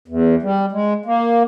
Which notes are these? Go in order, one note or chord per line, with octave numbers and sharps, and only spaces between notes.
E2
G3
G#3
A#3